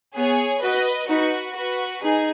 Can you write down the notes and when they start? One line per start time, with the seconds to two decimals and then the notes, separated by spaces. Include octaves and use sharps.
0.15 B3 G#4 C#5
0.62 F#4 B4 D#5
1.09 D#4 F#4 B4
1.56 F#4 B4
2.03 D#4 G#4